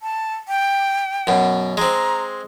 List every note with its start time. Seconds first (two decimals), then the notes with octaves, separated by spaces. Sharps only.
0.01 A5
0.48 G5
1.27 F#2 B2
1.77 G#3 C4 A#5